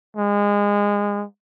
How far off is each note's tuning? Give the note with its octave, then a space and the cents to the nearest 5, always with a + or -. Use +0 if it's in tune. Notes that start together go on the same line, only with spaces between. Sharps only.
G#3 -25